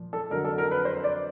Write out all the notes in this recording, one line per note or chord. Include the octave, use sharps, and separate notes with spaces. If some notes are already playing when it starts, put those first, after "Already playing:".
Already playing: A#2 F3
A4
F2 D3 F#3 A#4
A4
A#4
B4
C5
D5